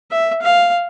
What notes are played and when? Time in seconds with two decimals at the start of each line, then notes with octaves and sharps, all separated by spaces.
0.11 E5
0.41 F5